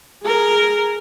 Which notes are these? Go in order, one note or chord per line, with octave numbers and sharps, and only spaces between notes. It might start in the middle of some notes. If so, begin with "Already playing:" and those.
G#4 A#4